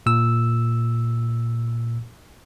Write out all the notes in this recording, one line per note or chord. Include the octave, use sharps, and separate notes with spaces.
A#2 E6